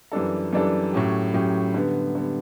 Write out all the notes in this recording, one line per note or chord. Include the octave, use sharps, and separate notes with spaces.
F#2 E3 G3 D4 A4
F#2 E3 G3 D4 A4
A2 F#3 C#4 G4
A2 F#3 C#4 G4
D3 G3 B3
D3 G3 B3